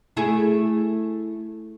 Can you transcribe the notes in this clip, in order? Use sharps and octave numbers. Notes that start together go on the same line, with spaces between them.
A3 E4 G#4